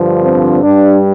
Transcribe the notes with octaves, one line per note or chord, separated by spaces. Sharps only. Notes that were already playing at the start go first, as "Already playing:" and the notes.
Already playing: G2 D3 F3
C4
G2 G3 D4